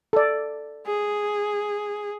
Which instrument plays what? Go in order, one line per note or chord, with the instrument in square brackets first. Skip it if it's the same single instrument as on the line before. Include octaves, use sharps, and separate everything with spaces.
[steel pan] A4 D5
[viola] G#4